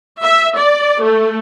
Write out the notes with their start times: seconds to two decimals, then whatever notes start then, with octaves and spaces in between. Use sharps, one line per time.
0.23 E5
0.56 D5
1.03 A3